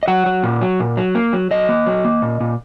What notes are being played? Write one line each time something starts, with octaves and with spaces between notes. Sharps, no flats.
D#5
F#3 F#5
F#3
A#2
F#3
A#2
F#3
A#3
F#3
F#3 D#5
A#3
F#3
A#3
A#2
A#2